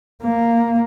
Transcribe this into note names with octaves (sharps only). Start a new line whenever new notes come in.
A#3